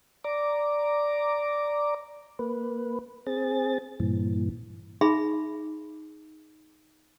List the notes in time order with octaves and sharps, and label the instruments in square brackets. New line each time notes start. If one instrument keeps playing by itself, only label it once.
[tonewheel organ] D5 A#5 D6
A#3 B4
C4 G#4 A6
G2 A#2 E3
[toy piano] D#4 G#4 E5 B5 C6